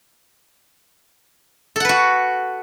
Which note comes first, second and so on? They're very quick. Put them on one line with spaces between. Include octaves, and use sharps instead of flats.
A4 F#5 B4 F#4